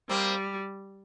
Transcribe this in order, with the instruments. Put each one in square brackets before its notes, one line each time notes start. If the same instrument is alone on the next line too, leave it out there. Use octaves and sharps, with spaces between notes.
[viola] G3 [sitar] A#3 C4